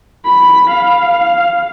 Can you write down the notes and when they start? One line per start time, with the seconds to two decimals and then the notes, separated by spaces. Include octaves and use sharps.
0.24 B5
0.70 F5